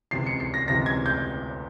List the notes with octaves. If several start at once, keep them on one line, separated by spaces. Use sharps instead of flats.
C#2 C3 E3 C7
C#7
C7
A#6
C#2 C3 E3 A#6
G#6
G6